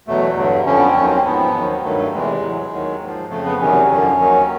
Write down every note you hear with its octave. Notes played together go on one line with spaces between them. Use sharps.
E2 B2 F#3 A3
G2 D3 F#3
F2 D3 F3 C#4
B3
C4
D#2 D#3 F#3 C#4
C4
G#2 F3 B3
D#2 D#3 F#3
G2 D#3 F#3 A3
A3
E2 C3 E3 G#3
A2 F#3
D#2 D#3 F#3
G#2 F3
F2 C#3 F3 A3
B3
E2 C3 D#3 F#3 C#4
F#2 D3 F3
D#2 D#3 F#3